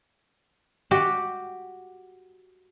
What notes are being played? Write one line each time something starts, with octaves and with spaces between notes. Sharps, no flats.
F#4 G4